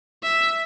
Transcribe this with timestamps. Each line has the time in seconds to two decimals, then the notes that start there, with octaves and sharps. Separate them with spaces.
0.23 E5